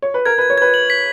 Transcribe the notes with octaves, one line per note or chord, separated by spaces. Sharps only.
C#5
B4
A#4 G#6
B4
G#6
C#5
B4 G#6
F#7
B6